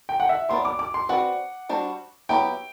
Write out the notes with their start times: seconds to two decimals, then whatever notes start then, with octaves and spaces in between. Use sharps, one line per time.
0.09 G5
0.20 F#5
0.29 E5
0.49 F#3 B3 F#4 B4 D5 C6
0.65 D6
0.79 D6
0.94 C6
1.09 C4 F#4 B4 D5 F#5
1.69 G3 D4 F#4 C5
2.29 F#3 B3 E4 G4 G5